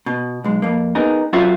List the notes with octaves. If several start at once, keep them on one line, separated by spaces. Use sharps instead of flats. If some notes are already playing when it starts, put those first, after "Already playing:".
B2
B1 G#3
F2 A#3
B3 D#4 G#4 A#4
F#3 C4 F4 F#4 A4 E5